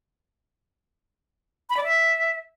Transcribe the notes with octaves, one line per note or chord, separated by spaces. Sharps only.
B5
D5
E5